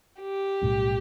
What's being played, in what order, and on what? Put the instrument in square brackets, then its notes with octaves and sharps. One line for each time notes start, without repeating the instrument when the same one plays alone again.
[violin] G4
[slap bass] B1 A2 G3 C#4